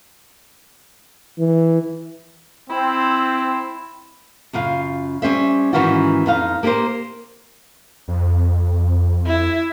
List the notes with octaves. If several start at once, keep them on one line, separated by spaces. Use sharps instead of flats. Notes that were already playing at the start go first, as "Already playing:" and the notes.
E3
C4 E4
F#2 C#3 F4 F5
G3 C#4 C5 E5
G#2 D#3 E3 C#4 F4 F#4
F2 D#4 F5
A#3 G4 A4 A#4 C5
F2
E4